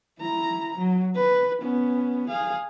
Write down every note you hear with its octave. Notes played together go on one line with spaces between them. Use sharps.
E4 A#5
F#3
B4
B3 C#4
G#4 F5